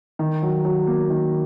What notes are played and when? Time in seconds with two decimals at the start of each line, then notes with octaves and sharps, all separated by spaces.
0.19 D#3
0.43 F#3
0.65 F#3
0.87 A#3
1.10 D#3